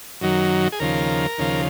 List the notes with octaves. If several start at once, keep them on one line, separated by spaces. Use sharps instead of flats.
F#2 D#3 F#3
G#4
D#2 C#3 F3 A#4
D#2 C#3 F3